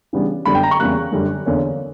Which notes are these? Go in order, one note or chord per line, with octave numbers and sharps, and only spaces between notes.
C#3 E3 G3 B3 D4
F#2 D3 G3 B3 B5
G5
A#5
C#6
E2 C#3 G3 A#3 F#6
F#2 D3 G3
E2 D3 A#3 C#4